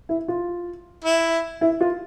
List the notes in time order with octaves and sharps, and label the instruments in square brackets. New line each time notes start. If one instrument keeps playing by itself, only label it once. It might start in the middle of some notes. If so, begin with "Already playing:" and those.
[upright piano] E4
F4
[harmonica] E4
[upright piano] E4
F4